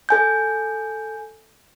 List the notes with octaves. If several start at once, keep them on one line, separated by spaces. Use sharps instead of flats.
A4 G#5 G6